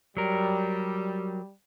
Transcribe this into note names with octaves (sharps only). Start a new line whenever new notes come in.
F#3 G3 A#4